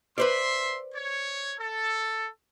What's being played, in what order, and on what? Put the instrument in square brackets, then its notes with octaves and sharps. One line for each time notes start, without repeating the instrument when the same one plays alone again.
[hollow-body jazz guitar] B4 C5 D5 [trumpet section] E5 C6
[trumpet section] C#5
A4